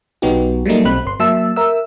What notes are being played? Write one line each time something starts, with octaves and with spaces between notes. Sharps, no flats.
B1 F#3 B3 D#4 F#4 G4
F#3 G3 A3 A#3 D#4
B1 C4 B5 F#6
G1 C6
F#3 A#3 E5 A5 E6
A#4 E5 E6